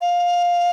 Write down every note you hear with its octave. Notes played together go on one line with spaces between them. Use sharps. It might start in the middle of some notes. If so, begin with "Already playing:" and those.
F5